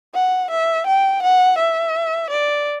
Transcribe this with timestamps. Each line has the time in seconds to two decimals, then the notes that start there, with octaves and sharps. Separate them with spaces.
0.14 F#5
0.51 E5
0.87 G5
1.22 F#5
1.59 E5
2.30 D5